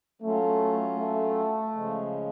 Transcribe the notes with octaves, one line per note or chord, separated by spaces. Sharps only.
F#3 A3 C#4 F4
A3
C#3 F3 G#3